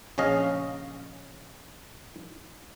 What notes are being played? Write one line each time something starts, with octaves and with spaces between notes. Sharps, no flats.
A#1 C#3 C#4 D#5 F5